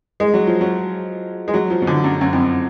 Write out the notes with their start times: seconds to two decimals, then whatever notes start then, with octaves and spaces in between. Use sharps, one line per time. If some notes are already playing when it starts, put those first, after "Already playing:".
0.20 G#3
0.34 F#3
0.47 F3
0.61 F#3
1.48 G#3
1.54 F#3
1.70 F3
1.82 B2
1.87 D3
2.04 F#2
2.21 F#2
2.33 F2